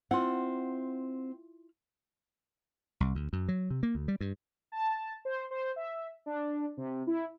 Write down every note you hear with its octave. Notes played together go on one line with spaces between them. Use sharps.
C4 E4 F4 F#5
C2
D2
F#2
F#3
C3
A#3
D2
G3
G2
A5
C5
C5
E5
D4
C3
E4